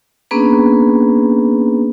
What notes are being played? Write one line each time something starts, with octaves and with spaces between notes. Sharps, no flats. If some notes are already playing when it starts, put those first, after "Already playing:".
A#3 B3 C#4 D4 G#4 B4